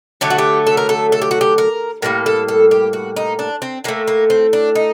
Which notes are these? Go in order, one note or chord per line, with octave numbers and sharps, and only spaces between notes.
D3 F#3 A3 G4
F#4
G4
A4
A#4
A4
A4
G4
F#4
G4
A#4
A2 G3 A#3 A#4
A4
A4
G4
F#4
D#4
D4
C4
A2 A3 A#3
A#3
C4
D4
D#4